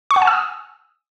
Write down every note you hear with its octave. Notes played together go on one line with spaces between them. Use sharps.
C#6
F#5
G#5
E6
D#6